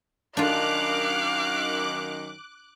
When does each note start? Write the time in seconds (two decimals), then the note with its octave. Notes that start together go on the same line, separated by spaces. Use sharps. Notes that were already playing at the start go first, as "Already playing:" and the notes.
0.37 F#2 D#3 D4 F4 F5 D6 F#6